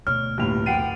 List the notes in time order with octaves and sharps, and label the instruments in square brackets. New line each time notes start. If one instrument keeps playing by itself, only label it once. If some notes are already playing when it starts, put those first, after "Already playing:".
[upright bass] D2 B2 [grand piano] C#5 [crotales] F6
[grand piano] G1 A2 C3 [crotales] F6 F7
[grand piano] F#1 F#5 D#7 [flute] G5 [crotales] A6 C7 D7